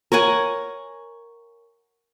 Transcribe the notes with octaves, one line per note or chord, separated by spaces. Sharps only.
A#4 C#5 F#5 G#5